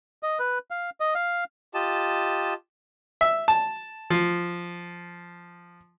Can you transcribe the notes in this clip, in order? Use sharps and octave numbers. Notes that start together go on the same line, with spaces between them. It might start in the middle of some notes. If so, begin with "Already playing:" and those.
D#5
B4
F5
D#5
F5
F4 G4 D#5 A5
E5
A5
F3